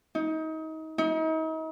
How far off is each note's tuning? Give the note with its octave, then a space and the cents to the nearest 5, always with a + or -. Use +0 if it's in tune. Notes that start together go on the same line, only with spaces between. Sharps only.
D#4 +30
D#4 +40